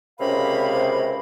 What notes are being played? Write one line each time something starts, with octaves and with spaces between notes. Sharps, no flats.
C#2 C3 C#4 A#4 F5 B5